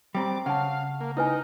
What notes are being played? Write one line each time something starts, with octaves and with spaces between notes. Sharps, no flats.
G3 C4 G5 A#5 D6
C#3 F5 F#5 A5
A#3
D#4 E4 B4 G#5